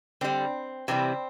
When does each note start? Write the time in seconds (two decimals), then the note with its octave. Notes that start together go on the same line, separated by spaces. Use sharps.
0.21 D3 G3 C4
0.88 C3 E3 G3 C4